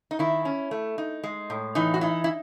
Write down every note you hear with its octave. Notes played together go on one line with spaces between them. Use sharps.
D#4
D#3 E4
C#4
A3
D#4
G#3
A2
E3 D#4
F#4
D#4 E4
E4